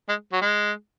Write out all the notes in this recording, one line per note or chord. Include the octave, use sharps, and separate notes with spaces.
G#3
F#3
G#3